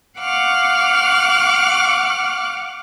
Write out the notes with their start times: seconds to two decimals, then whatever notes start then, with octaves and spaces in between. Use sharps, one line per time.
0.17 F5 F#5 C#6 D6 F6 F#6